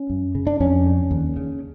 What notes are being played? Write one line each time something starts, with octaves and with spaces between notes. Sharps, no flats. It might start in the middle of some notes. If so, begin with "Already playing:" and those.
Already playing: C#4
F#2
C#3
D4
F2 C#4
C#3
D#2
C#3